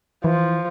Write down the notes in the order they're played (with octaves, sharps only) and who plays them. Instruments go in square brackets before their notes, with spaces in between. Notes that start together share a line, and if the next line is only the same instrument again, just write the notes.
[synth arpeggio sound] E3 [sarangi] F3